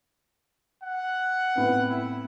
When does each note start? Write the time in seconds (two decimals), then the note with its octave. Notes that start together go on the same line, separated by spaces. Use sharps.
0.83 F#5
1.55 A2 B3 C4
1.89 E4